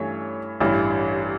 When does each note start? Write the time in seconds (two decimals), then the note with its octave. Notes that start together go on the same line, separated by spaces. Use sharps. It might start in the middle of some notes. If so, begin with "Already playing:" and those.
Already playing: G2 E3 A3 C#4 C#5
0.60 A1 G2 E3